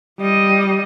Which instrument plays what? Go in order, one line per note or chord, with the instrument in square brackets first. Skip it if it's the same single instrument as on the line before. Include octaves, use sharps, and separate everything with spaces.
[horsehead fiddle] G3 D#5